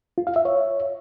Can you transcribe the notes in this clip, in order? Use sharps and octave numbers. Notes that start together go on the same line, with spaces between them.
F4
F5
E5
C#5